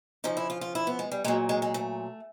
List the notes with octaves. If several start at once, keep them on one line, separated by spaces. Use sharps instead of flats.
C#3 F3 D#4
E4
F4
F4
E4
B3
G#3
G3
A#2 F#3 G#3
G#3
G#3
A3